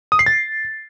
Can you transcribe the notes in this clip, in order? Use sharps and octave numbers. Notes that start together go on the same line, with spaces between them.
D#6
C7
A6